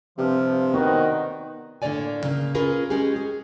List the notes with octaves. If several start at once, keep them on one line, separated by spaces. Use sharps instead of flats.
G2 C3 F3
D#3 B3 C4 D4 D#4 F#4
A2 D3 A#3 C#5 D5 G#5
C#3 A#3
C#4 F4 G#4 A#4 B4
G#3 C#4 G4 G#4
G#4